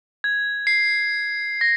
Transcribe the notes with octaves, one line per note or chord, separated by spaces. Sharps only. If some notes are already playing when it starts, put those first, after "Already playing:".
G#6
C7
A#6